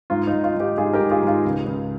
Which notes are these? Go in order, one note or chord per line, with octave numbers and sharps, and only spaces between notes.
G#2 F4
D#4
G#2
F4
G#2
D#4 G4
G#2 F4 G#4
G4 A#4
G#2
F4 G#4
G#2 F4
C#2
C#2